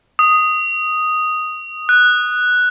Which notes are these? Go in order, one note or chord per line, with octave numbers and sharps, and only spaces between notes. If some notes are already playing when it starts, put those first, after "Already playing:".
D#6
F#6